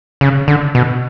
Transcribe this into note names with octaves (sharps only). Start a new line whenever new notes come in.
C#3
D3
B2